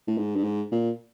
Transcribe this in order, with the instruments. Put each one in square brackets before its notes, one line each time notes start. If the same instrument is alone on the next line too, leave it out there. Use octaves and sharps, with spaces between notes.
[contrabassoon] A2
G#2
G2
G#2
A#2